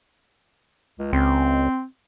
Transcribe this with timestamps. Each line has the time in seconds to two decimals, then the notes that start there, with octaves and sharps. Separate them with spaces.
0.99 C#2
1.13 C#2 C4